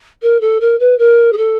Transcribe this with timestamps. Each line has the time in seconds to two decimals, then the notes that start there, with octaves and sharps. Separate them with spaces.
0.22 A#4
0.40 A4
0.60 A#4
0.79 B4
0.98 A#4
1.32 G#4
1.37 A4